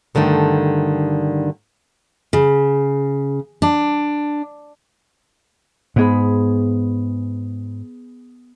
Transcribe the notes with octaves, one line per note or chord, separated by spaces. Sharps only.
G2 D3 D#3 A3
C#3
D4
G#2 B3 G#4 B5